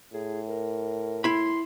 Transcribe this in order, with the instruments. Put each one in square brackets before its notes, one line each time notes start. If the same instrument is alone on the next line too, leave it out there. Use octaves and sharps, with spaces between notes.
[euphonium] A2 [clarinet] G#4
[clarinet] A#4
[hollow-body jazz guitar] E4 B5 [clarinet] C6